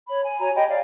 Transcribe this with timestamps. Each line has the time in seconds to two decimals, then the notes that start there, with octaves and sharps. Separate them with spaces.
0.07 C#5 B5
0.22 G#5
0.40 F#4 C#5 G#5 A#5
0.55 G4 D#5 G5 B5
0.69 C#5 D5 F5